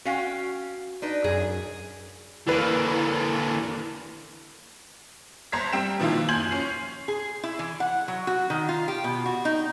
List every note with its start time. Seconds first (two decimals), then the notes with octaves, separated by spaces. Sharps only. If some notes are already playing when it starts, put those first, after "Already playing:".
0.05 C#4 F#4 F5 G5
1.02 D4 D#4 B4
1.24 F#2 G#4
2.47 D3 E3 A#3 B4
5.52 G1 C5 A#5 G#6 B6
5.73 G3 C4 G5 E7
6.00 B2 D#3 F3 A#3 E4 F4
6.28 F#1 G#5 C6 G6 G#6 F#7
6.51 C#4 C7
7.08 G#4
7.43 E4
7.59 E3
7.80 F#5
8.08 F#3
8.27 F#4
8.50 D#3
8.69 F4
8.88 G4
9.04 B2
9.26 F#4
9.45 D#4